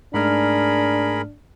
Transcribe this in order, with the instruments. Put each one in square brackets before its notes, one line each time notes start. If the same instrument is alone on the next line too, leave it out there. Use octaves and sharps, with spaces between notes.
[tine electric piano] G#2 A3 F6 [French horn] D4 [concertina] G#4 A#4 B5